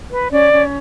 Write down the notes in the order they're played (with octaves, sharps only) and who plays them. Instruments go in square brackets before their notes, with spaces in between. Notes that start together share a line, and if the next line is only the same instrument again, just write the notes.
[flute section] B4
C#4 D5
C#4